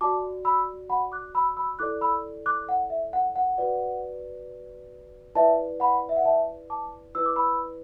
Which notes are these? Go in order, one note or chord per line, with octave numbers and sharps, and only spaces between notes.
F#4 D5 A5 D6
B5 E6
F#5 B5
D6 F#6
B5 E6
B5 E6
E4 A4 D5 D6 F#6
B5 E6
D6 F#6
F#5
E5
F#5
F#5
F#4 B4 D5
E4 B4 D5 E5 A5
F#5 B5
E5
F#5
E5 A5
A5 D6
E4 B4 D5 E6
D6
B5 E6